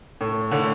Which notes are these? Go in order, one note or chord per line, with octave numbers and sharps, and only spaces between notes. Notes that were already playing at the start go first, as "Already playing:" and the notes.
A2
A2 D3